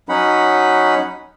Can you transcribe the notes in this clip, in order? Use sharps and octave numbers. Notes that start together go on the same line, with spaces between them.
F#3 C#4 D#4 F#5 B5